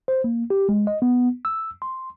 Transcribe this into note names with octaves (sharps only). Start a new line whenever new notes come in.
C5
A#3
G4
G#3
D#5
B3
E6
C6